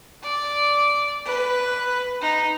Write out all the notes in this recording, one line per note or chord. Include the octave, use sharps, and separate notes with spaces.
D5
B4
D#4